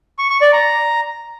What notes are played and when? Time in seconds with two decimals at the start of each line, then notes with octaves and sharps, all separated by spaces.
0.19 C#6
0.30 C#6
0.41 D5
0.53 A#5